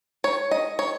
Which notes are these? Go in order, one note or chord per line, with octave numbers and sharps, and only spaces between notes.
C#5
D#5
C#5